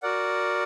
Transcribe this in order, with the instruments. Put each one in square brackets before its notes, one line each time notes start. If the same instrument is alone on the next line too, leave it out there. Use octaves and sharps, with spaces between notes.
[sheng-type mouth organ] F#4 A#4 D5 F#5